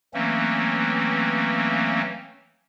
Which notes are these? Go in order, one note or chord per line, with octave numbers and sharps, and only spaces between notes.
E3 F#3 A3 A#3 C4 C#4